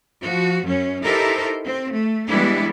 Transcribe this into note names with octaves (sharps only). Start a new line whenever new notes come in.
F3 F#4
F#2 C#4
D#4 E4 G4 A4 A#4 C5
C4
A3
E3 G3 G#3 B3 D4 E4